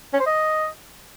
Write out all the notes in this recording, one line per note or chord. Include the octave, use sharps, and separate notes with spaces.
C#4
C5
D#5